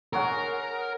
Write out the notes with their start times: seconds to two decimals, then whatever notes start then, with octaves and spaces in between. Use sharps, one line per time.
0.13 G#4 A#4 C#5 F#5